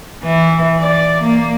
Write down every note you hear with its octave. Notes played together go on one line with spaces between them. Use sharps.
E3
D5
A#3